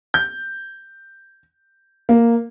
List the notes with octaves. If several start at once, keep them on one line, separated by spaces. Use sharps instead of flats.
G6
A#3